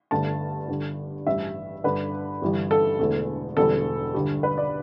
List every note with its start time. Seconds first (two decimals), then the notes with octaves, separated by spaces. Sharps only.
0.11 G1 G2 D3 A3 A5
0.68 G1 G2 D3
1.26 A1 G2 G3 E5
1.84 G1 G2 D3 B4
2.42 G1 G2 E3 G3
2.71 A4
2.99 E1 E2 D3 A3
3.57 E1 E2 D3 G3 A4
4.14 G1 G2 D3 G3
4.43 B4
4.57 D5